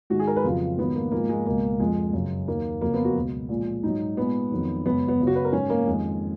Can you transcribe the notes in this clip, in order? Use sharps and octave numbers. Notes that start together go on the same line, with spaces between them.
G#2 D#3 G#3 F#4
G#4
A#4
B4
F2 C#3 F#3 F4
G#2 D#3 F#3 B3
A#3
G#2 F3 G#3 A#3
G#3
C#2 B2 G#3 A#3
F2 F3 G#3
F#2 C#3 G#3
D#2 D#3 F#3 A#3
F2 C#3 F#3 A#3
B3
F#4
C#2 B2 F#3
A#2 F3 G#3
G#2 F#3 D#4
A#2 G#3 B3
F2 D#3 F#3
F#2 C#3 G#3 B3
B3
F#2 C#3 F#3
F#4
B4
A#4
G#2 F#3 C#4
A#3
F2 D#3 G#3